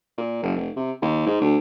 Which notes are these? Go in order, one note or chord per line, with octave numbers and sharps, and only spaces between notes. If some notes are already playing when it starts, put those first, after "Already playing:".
A#2
F#1
F1
C3
D#2
G#2
D2